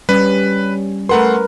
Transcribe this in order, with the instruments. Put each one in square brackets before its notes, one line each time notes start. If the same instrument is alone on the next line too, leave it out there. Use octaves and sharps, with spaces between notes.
[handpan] G3 C#4 [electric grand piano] B4
[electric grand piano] A3 F#5 C6 [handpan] A#4 B4